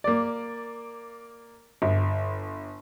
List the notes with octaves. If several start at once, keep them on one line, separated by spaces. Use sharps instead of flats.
A#3 D5
G1